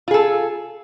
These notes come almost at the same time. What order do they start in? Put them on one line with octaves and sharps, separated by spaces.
F4 G#4 A4